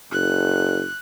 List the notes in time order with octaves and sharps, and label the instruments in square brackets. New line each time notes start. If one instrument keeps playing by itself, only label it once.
[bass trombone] F#1 [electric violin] F#6